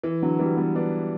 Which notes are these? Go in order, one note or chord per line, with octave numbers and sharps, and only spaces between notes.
E3
D3 F#3
E3 G3
G3 B3
B3 D4